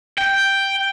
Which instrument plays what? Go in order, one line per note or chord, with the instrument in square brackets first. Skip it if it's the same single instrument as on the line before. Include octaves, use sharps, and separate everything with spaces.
[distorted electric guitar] G5